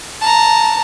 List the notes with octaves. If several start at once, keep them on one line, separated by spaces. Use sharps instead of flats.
A5 A#5